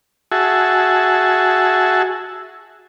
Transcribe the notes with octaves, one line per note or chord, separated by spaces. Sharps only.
F#4 G#4 E5 A5